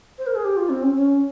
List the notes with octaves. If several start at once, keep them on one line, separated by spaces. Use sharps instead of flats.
C5
A#4
G#4
G4
F4
C4
C#4
C#4